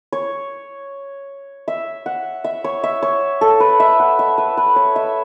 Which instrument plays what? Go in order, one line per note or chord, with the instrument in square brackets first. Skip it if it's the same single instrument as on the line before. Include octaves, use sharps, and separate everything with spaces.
[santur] C#5
E5
F#5
E5
C#5
E5
C#5
A4
B4
E5
F#5
E5
B4
B4
C#5
E5